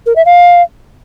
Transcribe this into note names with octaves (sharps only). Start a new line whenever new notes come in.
A#4
E5
F5